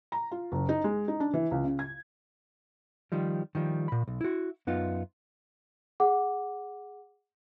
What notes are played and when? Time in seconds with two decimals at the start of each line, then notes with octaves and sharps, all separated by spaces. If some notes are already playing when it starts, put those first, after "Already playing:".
0.12 A#5
0.31 F4
0.52 F#1
0.69 D#4
0.84 G#3
1.08 D#4
1.20 D4
1.33 E3
1.51 C#2
1.64 C#3
1.79 G#6
3.12 D#3 F3 G3
3.55 D#3 F3 G3
3.88 A#2 B5
4.07 B1
4.21 E4 F#4
4.67 F#2 B3 D#4 F4
6.00 G#4 F#5 D6